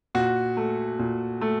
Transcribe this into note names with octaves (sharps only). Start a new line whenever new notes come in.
A#2 F#4
A3
A#2
A3